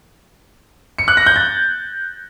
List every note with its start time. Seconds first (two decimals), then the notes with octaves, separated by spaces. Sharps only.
0.98 C#7
1.08 F#6
1.17 A#6
1.26 G6
1.36 A6